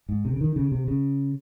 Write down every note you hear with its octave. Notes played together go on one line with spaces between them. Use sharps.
G#2
C3
C#3
D#3
C#3
C3
C#3